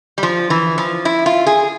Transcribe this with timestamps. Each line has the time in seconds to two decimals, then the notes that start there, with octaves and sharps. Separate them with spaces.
0.18 G3
0.23 F3
0.50 E3
0.78 F3
1.05 E4
1.26 F4
1.46 G#4